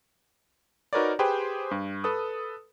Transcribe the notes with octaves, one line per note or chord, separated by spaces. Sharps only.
D#4 F#4 A#4 B4 C#5 D5
G4 G#4 B4 C5 G5
G2
A4 B4 D#6